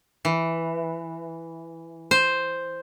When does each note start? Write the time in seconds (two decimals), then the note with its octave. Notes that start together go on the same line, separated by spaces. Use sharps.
0.25 E3
2.11 C5